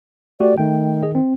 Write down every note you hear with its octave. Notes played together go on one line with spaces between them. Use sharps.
A3 F#4 G4 D5
D#3 A3 G5
G#4 D#5
C4